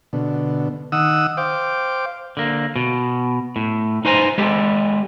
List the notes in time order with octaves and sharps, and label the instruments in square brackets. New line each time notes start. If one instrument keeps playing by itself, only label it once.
[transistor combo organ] B2 D3
D#3 F#5 D#6 E6
C5 F5 G5 D6
[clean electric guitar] D3 A#3
B2
A2
D#4 B4 C5 G#5 A#5
G#3 B3 G4 A4